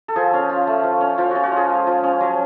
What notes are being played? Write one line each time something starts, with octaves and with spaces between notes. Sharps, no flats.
A4
F3 G#4
C#4
F4
A3
F3
C#4
F3 F4
C#4 F#4
F#4
F4 G#4
G#3
F3
C#4
F#3